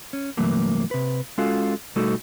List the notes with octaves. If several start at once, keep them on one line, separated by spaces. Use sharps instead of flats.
C#4
G2 C3 E3 F#3 A3 A#3
C3 B4
G#3 C#4 F4 F#4 A4 F5
B2 G3 A3 D#4 F#4 A4